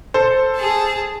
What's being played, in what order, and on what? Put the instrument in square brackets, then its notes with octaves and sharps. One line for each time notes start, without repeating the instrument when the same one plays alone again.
[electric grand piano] A4 C5
[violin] G#4 A5